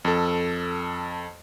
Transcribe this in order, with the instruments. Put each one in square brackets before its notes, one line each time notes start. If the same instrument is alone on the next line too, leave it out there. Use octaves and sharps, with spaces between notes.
[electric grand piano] F2 A4